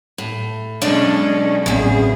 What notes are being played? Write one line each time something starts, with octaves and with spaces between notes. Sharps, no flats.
A2
B1 G#3 C#4 D4 D5 D#5
A1 E2 C#3 C4 G#4